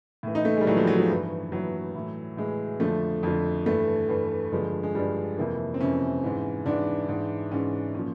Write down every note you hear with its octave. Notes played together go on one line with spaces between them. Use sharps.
A2 E3
D#4
A3
G3 G#3
A2 E3 F#3
F3
F#3
F3
G2 E3
G2 E3 F#3
A2 E3
A2 E3 G#3
F2 D3 F3 A3
F2 D3 F3
G2 E3 A3
G2 E3
G2 D3 F3 G#3
G#3
G2 D3 F3 G3
F2 C3 E3 A#3
C4
F2 C3 E3 C#4
G#2 E3
G#2 E3 D4
G#2 E3
G#2 E3 C#4
A#2 F3 C#4